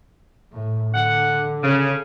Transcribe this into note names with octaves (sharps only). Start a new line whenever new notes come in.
A2
D3 F#5
C#3